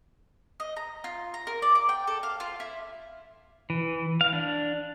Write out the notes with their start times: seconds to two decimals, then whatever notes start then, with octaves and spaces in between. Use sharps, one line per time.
0.60 D#5
0.76 A#5
1.04 F4
1.34 A#5
1.47 A#4
1.62 D5
1.75 D6
1.89 G5
2.07 A4
2.23 F5
2.40 F4
2.60 E4
3.70 E3
4.21 F5
4.33 D4